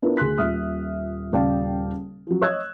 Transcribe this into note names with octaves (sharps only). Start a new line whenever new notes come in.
B3 D4 E4 F4 A#4 B4
D2 G#4 C6 F#6 B6
D#1 A#2 E5 D#6 F6
D#1 C#3 D5 F5 G5 A5
F3 F#3
C#5 D#5 E6 F#6 G#6